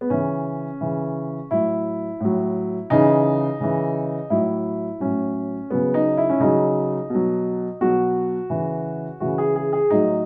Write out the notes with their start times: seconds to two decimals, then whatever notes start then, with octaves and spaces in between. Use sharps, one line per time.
0.01 B3
0.10 C#3 E3 C#4
0.81 C#3 E3
1.51 A2 F#3 E4
2.20 A2 F#3
2.90 C#3 E3 D#4
3.60 C#3 E3
4.30 A2 F#3 E4
5.00 A2 F#3 C#4
5.70 C#3 F#3 B3
5.94 D#4
6.17 E4
6.30 C#4
6.40 C#3 F#3 D#4
7.10 B2 F#3
7.81 B2 F#3 F#4
8.50 C#3 E3
9.20 C#3 E3 F#4
9.38 G#4
9.56 G#4
9.73 G#4
9.90 A2 F#3 D#4